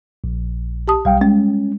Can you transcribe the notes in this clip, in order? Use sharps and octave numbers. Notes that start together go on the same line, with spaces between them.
A#1
G4 A5 D#6
B1 G3 F5 G5
G#3 C#4